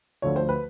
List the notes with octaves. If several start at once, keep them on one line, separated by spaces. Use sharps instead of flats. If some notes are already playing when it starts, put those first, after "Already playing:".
D2 D3 F3 A3 C#5
C5
B4